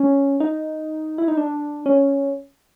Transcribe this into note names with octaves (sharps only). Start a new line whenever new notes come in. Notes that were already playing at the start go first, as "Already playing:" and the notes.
Already playing: C#4
D#4
E4
D#4
D4
C#4